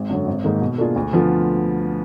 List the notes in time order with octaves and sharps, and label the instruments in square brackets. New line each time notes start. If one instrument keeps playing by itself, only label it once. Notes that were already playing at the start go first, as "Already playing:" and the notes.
Already playing: [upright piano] G#1
F#2 D3 F#3
G#1
G#2 D#3 A#3 D#4
B2
A#3 D4 F4 G#4
D2
D3 F3 B3 F4